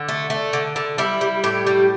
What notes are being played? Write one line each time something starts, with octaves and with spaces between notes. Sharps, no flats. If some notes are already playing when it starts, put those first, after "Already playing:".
Already playing: D3
A3
A3
D3
D3
G3 E4
G3
A2 G4
G3